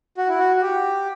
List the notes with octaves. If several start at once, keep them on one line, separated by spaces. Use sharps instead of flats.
F#4
E4
F#4
F#4
G4